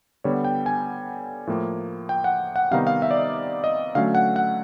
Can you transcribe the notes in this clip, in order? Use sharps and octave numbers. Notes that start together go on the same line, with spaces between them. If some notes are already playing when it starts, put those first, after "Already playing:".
D3 G3 B3 C#5
G5
G#5
A2 F3 A#3
G5
F#5
F#5
C3 D#3 G3 B3 D#4 F5
F5
E5
D5
D#5
D#5
D3 F#3 A3 C#4 F5
F#5
F#5